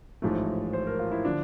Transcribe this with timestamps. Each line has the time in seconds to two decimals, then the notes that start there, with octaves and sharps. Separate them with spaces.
0.22 A1 G#2 F3 A3
0.73 C5
0.87 A#4
0.99 F4
1.12 E4
1.25 D3 F3 D4